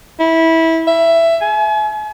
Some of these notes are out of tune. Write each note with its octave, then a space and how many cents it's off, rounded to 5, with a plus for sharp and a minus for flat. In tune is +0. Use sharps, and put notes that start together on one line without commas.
E4 -20
E5 +15
G#5 +40